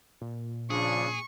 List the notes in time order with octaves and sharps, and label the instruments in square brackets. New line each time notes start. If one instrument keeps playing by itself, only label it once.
[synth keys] A#2
[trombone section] C#3 F3 D4 [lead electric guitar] G#4 [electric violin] C#6